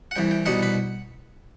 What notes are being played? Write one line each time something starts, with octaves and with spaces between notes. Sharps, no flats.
F#5
C2 C3 E3 G5
G5
C2 B2 G3 D#4 F#5
B4